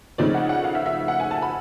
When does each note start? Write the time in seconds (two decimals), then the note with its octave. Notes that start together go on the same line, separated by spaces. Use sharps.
0.18 C#3 F3 A3 C4 D#4 D5
0.34 F#5
0.49 F#5
0.64 F5
0.75 E5
0.86 E5
1.08 F#5
1.20 G#5
1.31 A5
1.42 B5